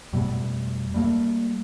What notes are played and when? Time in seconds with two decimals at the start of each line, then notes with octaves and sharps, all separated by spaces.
0.13 F2 B2 G3 A3
0.94 G3 A3 A#3